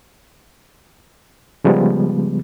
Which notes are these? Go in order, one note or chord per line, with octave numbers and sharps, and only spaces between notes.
C#3 F3 G3 G#3 B3